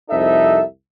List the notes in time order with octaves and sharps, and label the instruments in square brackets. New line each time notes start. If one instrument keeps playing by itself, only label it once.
[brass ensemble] C2 F2 D#4 A4 E5